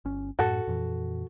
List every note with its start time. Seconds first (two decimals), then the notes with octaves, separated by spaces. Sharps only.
0.05 G1 C#4
0.39 F#2 A2 F#4 A4
0.67 F2 A#2 E3